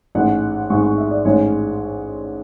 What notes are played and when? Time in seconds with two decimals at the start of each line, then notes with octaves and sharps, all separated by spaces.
0.15 A1 G#2 G#3 F#5
0.70 A1 G#2 G#3 C#6
0.83 C#6
0.98 E5
1.11 D5
1.25 A1 G#2 G#3 C#5